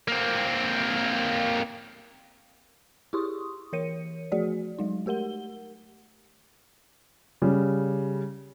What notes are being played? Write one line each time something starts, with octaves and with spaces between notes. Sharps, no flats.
A#3 C4
E4 G4 G#4 C6 C#6 D#6
E3 A#4 C#5 C#7 D#7
F3 A3 F#4 G#4 D5
F#3 G#3 D#4
A3 G4 A#4 F#5 G7
C#3 G3